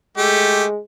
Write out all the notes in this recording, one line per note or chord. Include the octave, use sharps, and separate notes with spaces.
G#3 A3 G4